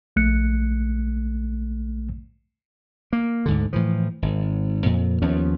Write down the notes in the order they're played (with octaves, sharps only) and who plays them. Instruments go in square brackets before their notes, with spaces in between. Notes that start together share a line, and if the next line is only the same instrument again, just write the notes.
[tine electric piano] A#1 A3 F#6 C#7
[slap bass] A#3
D2 G#2 D3
A2 E3 F3
G#1
F2 A#2
D#2 F3 B3 C#4